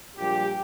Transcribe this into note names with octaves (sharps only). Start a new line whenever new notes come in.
A#1 A#2 G3 G4